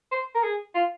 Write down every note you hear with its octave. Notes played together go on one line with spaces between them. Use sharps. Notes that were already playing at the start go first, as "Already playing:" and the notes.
C5
A#4
G#4
F4